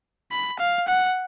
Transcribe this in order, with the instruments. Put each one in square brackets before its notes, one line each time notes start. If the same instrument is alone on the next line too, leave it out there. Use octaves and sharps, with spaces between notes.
[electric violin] B5
F5
F#5